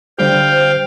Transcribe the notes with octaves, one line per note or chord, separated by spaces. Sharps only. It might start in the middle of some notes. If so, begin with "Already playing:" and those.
D3 G3 G4 C5 F5 G5